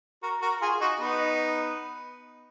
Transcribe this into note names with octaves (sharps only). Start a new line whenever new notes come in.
F#4 A#4
F#4 A#4
F4 G#4
D#4 F#4
B3 D#4